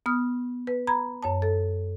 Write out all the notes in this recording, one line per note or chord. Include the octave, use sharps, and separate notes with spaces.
B3 D#6 F6
B4
A#5 B5 G#6
F#2 C#5 A5
A4